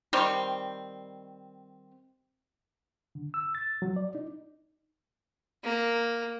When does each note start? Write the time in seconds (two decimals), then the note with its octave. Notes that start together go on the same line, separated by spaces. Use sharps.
0.13 D#3 G3 C4
3.15 D3
3.34 E6
3.55 A6
3.82 F#3
3.96 D5
4.15 D#4
5.64 A#3